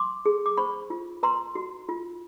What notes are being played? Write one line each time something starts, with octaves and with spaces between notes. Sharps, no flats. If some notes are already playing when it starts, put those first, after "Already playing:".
Already playing: C6 D6
G#4
D6
C5 B5 C#6
F4
B4 A#5 C6
F#4
F4